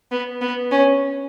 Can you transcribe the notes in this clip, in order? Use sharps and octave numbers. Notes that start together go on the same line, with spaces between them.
B3
B3
C#4